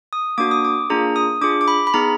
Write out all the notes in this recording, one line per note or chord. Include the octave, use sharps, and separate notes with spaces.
D#6
A#3 D4 F#4 D6
D#6
D6
A#3 D4 F4 G#4 A#5
D#6
D4 F4 G#4 D6
D6
B5
B5
B3 D#4 G#4 A#5